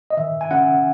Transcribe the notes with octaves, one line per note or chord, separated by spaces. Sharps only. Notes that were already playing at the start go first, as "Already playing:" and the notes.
D#5
D#3 E5
G#5
C#4 F#5